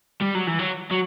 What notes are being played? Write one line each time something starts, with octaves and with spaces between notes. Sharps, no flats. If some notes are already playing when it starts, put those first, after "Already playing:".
G3
F#3
E3
F#3
F#3